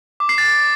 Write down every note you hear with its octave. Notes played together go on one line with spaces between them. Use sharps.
D6
C7
A6